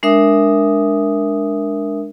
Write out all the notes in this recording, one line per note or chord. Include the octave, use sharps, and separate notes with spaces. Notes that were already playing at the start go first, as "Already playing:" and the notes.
G#3 D4 A#4 E5 D#6